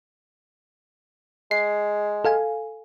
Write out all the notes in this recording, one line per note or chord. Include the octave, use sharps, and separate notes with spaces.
G#3 C7
A4 F5 G#5